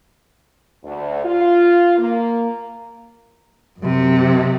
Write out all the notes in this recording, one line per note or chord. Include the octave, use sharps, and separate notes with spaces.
D2
F4
A#3
F#2 C3